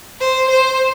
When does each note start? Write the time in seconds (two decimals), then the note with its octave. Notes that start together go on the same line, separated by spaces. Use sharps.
0.21 C5
0.51 C5